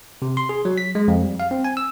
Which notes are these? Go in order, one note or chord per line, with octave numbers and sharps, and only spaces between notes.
C3
C6
G#4
F#3
B6
G#3
F2
G3
F5
C4
G#5
E6